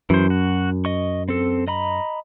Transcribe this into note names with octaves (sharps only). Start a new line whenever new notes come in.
F#2 E3 C5
F#4
D#5 C#6
C4 A4
D#5 A#5 B5